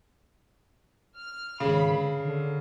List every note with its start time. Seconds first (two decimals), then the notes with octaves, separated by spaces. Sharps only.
1.17 F6
1.60 G#1 C#3 B5
1.91 D3
2.21 D3